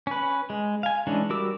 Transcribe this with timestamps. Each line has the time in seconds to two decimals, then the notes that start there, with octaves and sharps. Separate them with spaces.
0.07 C#4 B4
0.50 G#3
0.83 F5 G#5
1.07 E3 G#3 C#4 D4
1.30 G3 F#4 A#4 D6 E6